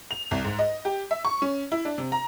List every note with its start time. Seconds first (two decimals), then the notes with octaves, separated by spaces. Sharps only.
0.11 F7
0.31 C2
0.44 G#2
0.59 D#5
0.85 G4
1.11 E5
1.25 C#6
1.42 C#4
1.72 E4
1.85 D4
1.98 C3
2.12 A#5